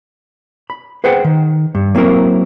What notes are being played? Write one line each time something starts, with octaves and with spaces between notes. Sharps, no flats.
B5
G#4 B4 C5 F#5 G5
D#3
G2
F#3 A#3 C4 E4 A#4